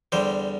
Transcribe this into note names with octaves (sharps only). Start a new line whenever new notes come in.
E2 D3 G3 C5